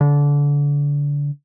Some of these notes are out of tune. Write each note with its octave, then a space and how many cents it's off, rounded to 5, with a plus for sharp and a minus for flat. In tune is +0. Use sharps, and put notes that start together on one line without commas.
D3 -25